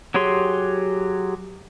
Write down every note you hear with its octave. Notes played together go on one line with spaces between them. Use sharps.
F#3 G4 G#4 C#5 C6